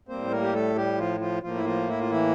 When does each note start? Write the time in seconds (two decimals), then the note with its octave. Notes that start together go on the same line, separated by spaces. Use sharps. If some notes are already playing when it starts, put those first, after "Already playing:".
0.09 A2 G3 A#3 C4 C5
0.31 A#3 A#4
0.43 G4
0.53 A3 A4
0.76 G3 G4
0.98 F3 F4
1.20 F3 F4
1.43 A2 F3 A#3 F4
1.55 E4
1.65 F3 F4
1.88 E4
1.99 F4
2.10 E3 E4